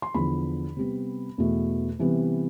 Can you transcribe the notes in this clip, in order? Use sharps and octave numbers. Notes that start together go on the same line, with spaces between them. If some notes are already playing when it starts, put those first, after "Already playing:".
C6
E2 D3 F3 B5
C3 G3 B3
E2 B2 A3
C3 E3 G3 B3